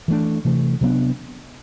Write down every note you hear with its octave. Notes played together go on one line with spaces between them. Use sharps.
E3 A3 D4
C3 E3 A3
C3 F#3 B3 D4